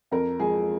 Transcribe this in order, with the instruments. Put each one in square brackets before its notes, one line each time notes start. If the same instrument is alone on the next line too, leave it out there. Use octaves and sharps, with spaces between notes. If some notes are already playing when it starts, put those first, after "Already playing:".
[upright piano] F2 A#4
F3 G#3 G#4